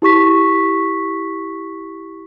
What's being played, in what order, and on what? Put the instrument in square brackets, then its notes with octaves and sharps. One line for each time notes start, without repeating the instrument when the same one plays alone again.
[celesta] E4 G4 C#6 B6